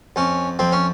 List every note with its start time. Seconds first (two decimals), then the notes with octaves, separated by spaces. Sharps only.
0.16 F2 C#4
0.59 F2 C4
0.72 C#4